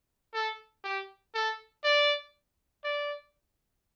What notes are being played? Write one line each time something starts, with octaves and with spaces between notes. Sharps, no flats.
A4
G4
A4
D5
D5